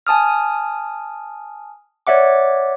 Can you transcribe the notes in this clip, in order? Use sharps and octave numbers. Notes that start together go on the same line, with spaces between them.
G#5 A5 D#6 F6
C#5 D5 E5 F#5 D6